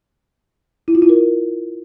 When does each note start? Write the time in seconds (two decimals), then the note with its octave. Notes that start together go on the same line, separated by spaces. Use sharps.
0.88 E4
0.95 F4
1.02 E4
1.09 A#4